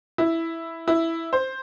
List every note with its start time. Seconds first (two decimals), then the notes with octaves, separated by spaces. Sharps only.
0.18 E4
0.88 E4
1.33 C5